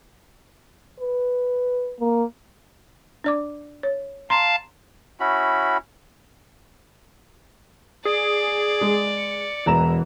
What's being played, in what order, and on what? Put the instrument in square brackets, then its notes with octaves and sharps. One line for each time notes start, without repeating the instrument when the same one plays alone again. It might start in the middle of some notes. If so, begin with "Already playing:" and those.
[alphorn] B4
A#3
[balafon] D4 D5 D6
C#5
[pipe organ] F5 A5 [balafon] A#5 C6
[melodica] C#4 E4 F#4 B5
[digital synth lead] G#4 [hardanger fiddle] D5
[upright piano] G#3
[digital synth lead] C#7
[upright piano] E1 A#5 E7 [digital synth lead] E3